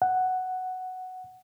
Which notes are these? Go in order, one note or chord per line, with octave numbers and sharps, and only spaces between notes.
F#5